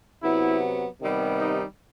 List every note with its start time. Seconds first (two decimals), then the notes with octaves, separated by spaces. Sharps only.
0.23 C3 F#3 B3 E4
1.01 C3 D#3 G3 B3
1.39 D#4